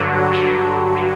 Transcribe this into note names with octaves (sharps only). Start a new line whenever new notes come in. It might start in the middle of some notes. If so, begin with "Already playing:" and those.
Already playing: G2 D3 F#3
F#4
G2 D3 F#3
D3 F#3